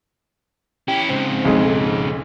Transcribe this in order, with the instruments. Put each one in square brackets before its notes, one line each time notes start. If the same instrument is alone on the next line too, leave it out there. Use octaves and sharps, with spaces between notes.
[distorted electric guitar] C#4 E4 [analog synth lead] G4
[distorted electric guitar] G#2 C#3 [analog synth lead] C4
[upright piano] B1 F2 G#3